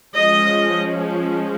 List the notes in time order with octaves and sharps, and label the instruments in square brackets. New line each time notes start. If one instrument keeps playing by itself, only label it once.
[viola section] F3 G#3 C#4 D#5